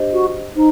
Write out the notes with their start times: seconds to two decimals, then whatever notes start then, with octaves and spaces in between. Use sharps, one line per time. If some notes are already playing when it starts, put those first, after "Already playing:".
Already playing: D4 G4 C5 D#5
0.13 F#4
0.56 D#4 C5